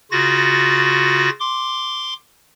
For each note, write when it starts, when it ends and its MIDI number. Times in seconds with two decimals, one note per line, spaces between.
0.11 1.30 49
0.11 1.30 65
0.11 1.30 66
0.11 1.30 93
0.11 1.30 94
1.40 2.14 84
1.40 2.14 86